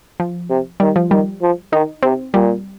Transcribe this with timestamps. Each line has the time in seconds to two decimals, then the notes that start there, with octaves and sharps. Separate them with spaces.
0.20 F3
0.50 C3
0.80 D#3 G3
0.96 F3
1.11 D#3 G3
1.42 F3
1.73 D#3 D#4
2.03 C3 C4
2.34 A#2 G3